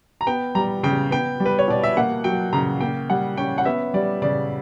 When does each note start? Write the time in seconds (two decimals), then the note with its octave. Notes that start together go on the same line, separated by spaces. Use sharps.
0.21 A#5
0.27 B3 G5
0.55 G3 A#5
0.83 C#3 G5
1.11 B3 G5
1.40 G3
1.46 B4
1.59 C#5
1.68 B2 D5
1.84 E5
1.97 A#3 F#5
2.24 F#3 G5
2.53 C#3 A#5
2.81 A#3 G5
3.10 G3 F#5
3.37 C#4 G5
3.58 F#5
3.65 B3 E5
3.94 G3 D5
4.22 C#3 D5